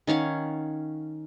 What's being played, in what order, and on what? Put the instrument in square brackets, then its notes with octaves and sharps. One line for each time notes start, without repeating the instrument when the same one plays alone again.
[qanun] D#3 C#4 F5 F#5